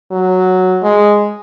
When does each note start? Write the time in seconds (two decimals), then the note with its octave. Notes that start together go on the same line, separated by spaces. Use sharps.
0.12 F#3
0.83 G#3